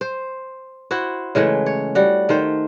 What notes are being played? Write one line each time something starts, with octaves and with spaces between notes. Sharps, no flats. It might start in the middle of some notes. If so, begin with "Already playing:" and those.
C5
E4 F#4 C5
C#3 E3 G#3 A3
C#5
G3 F#4
D#3 A3 C5